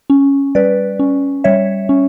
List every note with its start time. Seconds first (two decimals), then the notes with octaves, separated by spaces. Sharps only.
0.10 C#4
0.55 G3 B4 D5
0.99 C#4
1.44 G3 C#5 E5
1.89 C#4